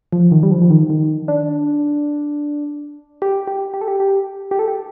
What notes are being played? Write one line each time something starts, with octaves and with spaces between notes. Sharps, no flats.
F3
D#3
G3
F3
F3
D#3
D#3
D4
G4
G4
G4
A4
G4
G4
G4
A4
G4